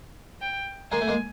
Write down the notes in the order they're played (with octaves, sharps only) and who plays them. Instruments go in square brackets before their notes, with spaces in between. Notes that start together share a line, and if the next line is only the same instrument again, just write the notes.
[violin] G5
[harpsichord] G#3 A#3 [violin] G#5
[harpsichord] A3
G#3 A#3